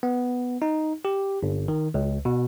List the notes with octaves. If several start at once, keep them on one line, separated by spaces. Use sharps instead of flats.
B3
D#4
G4
G1
D#3
C#2
B2